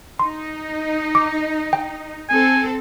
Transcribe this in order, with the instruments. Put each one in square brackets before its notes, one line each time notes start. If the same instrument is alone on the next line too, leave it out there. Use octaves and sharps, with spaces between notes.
[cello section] D#4 [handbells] C6
[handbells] D6
G5
[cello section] C4 A4 [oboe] G#5